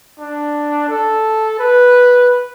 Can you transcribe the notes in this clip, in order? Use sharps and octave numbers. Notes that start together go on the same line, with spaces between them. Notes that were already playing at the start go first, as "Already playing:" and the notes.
D4
A4
B4